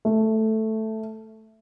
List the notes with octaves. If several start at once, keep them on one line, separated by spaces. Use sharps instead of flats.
A3